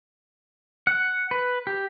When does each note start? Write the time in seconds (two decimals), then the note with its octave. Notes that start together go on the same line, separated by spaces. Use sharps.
0.87 F#5
1.31 B4
1.67 G4